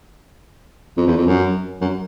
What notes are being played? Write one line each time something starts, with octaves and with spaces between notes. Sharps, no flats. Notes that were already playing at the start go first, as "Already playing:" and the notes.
F2
E2
F2
F#2
F#2